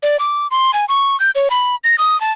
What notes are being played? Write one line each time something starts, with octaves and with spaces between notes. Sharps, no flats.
D5
D6
C6
G#5
C#6
G6
C#5
B5
A#6
D#6
A5